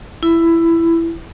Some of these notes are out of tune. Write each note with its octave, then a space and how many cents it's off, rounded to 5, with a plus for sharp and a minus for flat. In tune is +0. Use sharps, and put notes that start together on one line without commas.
E4 +15